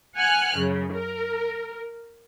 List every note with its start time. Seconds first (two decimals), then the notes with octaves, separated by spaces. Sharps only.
0.16 F#5 G#5 F6 F#6
0.56 F#2 C#3
0.94 A#4